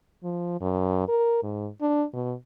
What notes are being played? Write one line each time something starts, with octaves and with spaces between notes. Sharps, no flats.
F3
F#2
A#4
G#2
D4
B2